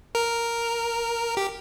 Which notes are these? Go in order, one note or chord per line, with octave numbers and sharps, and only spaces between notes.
A#4
G4